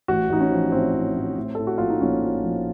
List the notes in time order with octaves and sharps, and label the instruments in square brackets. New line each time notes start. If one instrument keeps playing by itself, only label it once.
[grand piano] A1 F#4
A1 D#4
C#4
F3
A2 C4
A1
A1
A2
A2 A4
F#4
A#1 F4
D#4
A#1 C#4
F3
A#1